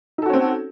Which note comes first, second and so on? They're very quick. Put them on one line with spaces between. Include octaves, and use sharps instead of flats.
D#4 A4 F#4 C#4 C4